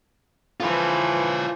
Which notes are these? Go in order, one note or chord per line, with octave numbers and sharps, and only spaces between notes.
E3 F3 F4 B4